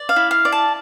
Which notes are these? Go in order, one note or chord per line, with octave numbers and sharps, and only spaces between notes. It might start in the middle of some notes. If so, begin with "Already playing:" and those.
Already playing: D5
F5
E4
F5
D5
A5